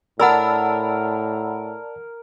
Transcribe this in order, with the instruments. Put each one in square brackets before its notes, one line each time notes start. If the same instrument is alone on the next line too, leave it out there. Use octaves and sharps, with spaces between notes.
[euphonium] A2 [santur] A#4 [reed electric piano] D5 A5 [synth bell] F#5 B5 E6